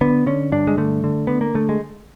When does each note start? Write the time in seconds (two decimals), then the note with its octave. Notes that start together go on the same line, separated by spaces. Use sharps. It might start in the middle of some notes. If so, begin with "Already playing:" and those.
0.01 D3 B3
0.26 D3 C#4
0.52 G2 D4
0.67 G#3
0.78 D3 A3
1.04 D3
1.27 D3 B3
1.41 A#3
1.54 D3 A3
1.69 G#3